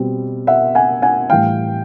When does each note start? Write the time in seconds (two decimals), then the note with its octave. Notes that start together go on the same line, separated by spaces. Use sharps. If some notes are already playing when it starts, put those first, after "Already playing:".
Already playing: B2 G3 C4
0.47 E5 F#5
0.75 F#5 G#5
1.02 F#5 G#5
1.30 A2 E3 G3 F5 G5